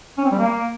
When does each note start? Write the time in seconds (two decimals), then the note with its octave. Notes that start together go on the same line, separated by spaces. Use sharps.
0.18 C#4
0.25 C4
0.31 G3
0.38 A#3